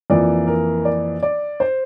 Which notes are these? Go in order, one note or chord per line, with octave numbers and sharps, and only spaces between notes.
F2 E3 A#3 D5
A#4
D5
D5
C5